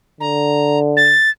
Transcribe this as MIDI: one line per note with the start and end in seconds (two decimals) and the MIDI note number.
0.21 1.16 50
0.21 0.79 82
0.97 1.30 93